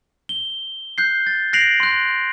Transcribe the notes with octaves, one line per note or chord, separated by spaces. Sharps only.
G7
F#6 G6 C7
A6
F#6 A#6 C7 D7 F7 F#7
C6 F#6